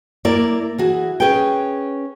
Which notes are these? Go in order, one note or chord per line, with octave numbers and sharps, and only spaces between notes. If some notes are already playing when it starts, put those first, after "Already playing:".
A#3 E4 D5
E3 F#4 G#4
C#4 G#4 B4 G5